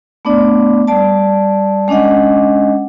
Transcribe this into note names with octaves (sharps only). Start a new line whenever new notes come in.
A3 B3 D4 D5
G3 D5 A5
G#3 C#4 D4 D#5 F#5